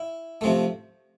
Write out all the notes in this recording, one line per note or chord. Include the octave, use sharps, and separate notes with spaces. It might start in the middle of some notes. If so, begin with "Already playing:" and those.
Already playing: E4
C3 F3 A3